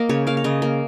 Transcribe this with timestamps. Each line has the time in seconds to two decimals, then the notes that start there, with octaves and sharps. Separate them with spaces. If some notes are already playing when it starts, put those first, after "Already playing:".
Already playing: A#3 A#4 D#5
0.09 C#3 C#5
0.27 A#3 F5
0.37 F5
0.44 C#3 D#5
0.62 A#3